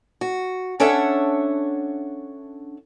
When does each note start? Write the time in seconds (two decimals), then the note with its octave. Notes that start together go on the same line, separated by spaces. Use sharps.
0.21 F#4
0.80 C#4 D4 A4 C#5 E5 F#5